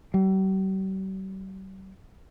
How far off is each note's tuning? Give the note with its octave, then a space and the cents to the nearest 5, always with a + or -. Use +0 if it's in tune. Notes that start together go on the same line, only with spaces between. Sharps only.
G3 -45